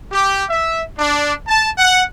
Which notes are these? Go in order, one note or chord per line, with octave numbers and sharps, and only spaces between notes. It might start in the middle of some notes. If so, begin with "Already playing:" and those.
G4
E5
D4
A5
F#5